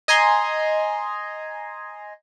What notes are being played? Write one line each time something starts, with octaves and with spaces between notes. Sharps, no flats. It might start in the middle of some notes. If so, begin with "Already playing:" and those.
D#5 G#5 A#5 C6